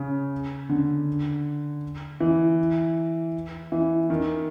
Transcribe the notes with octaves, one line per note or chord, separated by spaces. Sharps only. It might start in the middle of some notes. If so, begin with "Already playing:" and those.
Already playing: C#3
D3
E3
E3
D#3